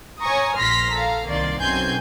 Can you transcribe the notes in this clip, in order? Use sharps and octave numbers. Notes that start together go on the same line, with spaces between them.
C#5 G#5 A#5 C#6 D#6
A#1 C6 F6 A#6 B6
A4 F5 A#5
C2 D#3 A#3 D5 C6
B1 F#2 C4 G#5 C6 G6